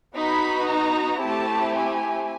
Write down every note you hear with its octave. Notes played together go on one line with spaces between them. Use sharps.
B3 D#4 F#4 B5
A#5
A3 C4 E4 G4 A5
G#5